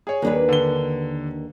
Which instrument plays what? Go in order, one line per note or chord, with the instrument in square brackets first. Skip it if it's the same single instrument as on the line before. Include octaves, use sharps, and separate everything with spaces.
[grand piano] G#4 C#5
[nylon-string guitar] D#2 D4 B4
[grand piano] D3 G7